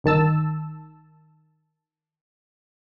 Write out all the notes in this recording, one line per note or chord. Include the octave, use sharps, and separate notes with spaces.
G1 D#3 A5 E6